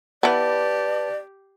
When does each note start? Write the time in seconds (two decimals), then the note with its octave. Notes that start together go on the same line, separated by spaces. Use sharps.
0.23 B3 E4 G4 B4 D5 A5